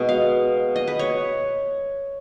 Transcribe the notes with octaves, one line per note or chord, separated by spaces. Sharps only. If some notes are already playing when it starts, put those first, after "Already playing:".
Already playing: B2 G#3 B3 D#5
F5
D#5
B4
C#5